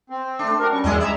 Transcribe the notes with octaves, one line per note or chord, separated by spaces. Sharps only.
C4
A3 D4
F#4 A#4
G3 C#4 C#6
E2 F#3 G#3 E4 D#5
D5 E5 A#5